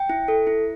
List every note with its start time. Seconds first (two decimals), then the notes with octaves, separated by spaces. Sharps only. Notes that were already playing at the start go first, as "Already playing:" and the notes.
Already playing: G5
0.10 E4
0.28 A4
0.47 E4